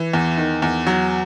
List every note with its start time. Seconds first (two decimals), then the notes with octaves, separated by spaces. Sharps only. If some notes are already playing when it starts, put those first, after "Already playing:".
Already playing: E3
0.13 E2
0.37 D#3
0.62 E2
0.87 F#3